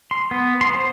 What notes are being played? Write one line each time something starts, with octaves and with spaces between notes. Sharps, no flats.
C6
B3
C6
C5